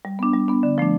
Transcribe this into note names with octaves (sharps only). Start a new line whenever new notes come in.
G3
B3 D4
G3
B3 D4
D3
F3 A3 D4